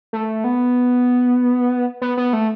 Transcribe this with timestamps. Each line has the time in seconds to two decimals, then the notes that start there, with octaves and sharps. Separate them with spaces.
0.13 A3
0.44 B3
2.02 B3
2.17 B3
2.33 A3